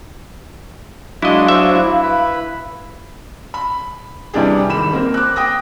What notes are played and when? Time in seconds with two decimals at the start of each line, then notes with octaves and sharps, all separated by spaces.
1.22 F#3 G#3 D4 E4 D#5 F5
1.48 C5 E5
1.74 E4
2.04 B4
3.54 B5
4.34 C3 E3 G3 D4 G4 G#4
4.69 G#1 B5 E7
4.93 A#3 C4
5.14 D6 F#6
5.36 G5 D#6 A#6